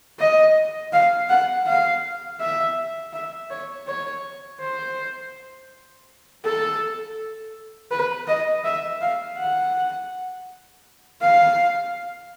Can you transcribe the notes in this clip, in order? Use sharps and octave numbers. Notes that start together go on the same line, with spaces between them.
D#5
F5
F#5
F5
E5
E5
C#5
C#5
C5
A4
B4
D#5
E5
F5
F#5
F5